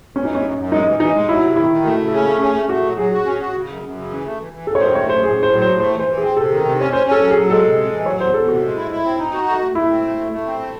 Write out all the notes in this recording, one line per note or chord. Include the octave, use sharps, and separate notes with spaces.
E3 C#4
D#4
F#2
C#4
F#2
F#2
G#3 D#4
E3
E3 D#4
G#3
F#3 E4
C3
D#3 E4
D#3
A3 F#4
C#3
A4
C#4 G#4
A3
C#4 G#4
A3
A3 F#4
F#3
F#3 G#4
F#4
C#4
F#4
C#3
F#2
F#2
C#3
E3
A3
E3
E3
F#2 A4
C#5
D#3 C5
A3 C#5
F#2 C5
A2 G#4
A2 C5
F#3
C5
A2
A3 C5
E3
C5
E3
G#4
C4
C3 A4
D#3
C3
C#4 C#5
C#4 C5
C#4 A4
F#3
G#4
F#3
G#3 A4
C3
G#3
E3
F#3 C#5
E2 C5
E2 A4
C3 F#4
G#3
E4
E4
C4
D#4
F#4
A3
A3
A3 E4
C4
A3
A3
A3
C4
A3